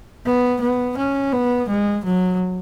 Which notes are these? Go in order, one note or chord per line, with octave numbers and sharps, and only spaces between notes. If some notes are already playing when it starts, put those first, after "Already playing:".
B3
B3
C#4
B3
G#3
F#3